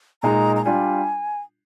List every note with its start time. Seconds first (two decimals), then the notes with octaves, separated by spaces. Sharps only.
0.23 A#2 G#3 D#4 A#5
0.56 A#5
0.65 G3 D4 F4 G#5